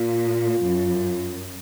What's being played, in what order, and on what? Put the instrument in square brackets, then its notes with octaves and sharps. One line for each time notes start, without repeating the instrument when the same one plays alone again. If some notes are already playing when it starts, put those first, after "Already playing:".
Already playing: [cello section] A#2 [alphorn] F4
[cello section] F#2